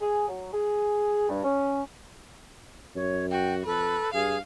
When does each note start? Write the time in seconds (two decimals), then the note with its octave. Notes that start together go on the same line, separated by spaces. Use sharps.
0.01 G#4
0.29 F#3
0.53 G#4
1.29 G2
1.44 C#4
2.95 F#2 C#5
3.31 F#4 G5
3.65 F2 A4 B4
4.14 G2 G#4 F5